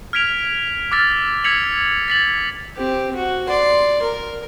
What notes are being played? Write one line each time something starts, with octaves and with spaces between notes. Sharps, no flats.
F6 G#6 B6 D7 F7
D6 E6 F6 A6 B6
E6 G#6 B6 C#7 F7 F#7
A6 B6 F#7
C4 G4
F#4
D5 C6
A#4